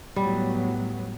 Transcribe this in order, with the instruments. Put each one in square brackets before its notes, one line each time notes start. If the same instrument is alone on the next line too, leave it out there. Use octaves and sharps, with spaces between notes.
[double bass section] A2 F#3 B3 [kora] G3